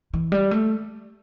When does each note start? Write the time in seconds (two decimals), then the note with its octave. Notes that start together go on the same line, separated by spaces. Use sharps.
0.14 E3
0.32 G3
0.51 A3